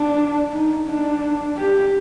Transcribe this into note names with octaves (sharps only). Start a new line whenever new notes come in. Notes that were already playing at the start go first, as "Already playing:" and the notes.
Already playing: D4
D#4
D4
G4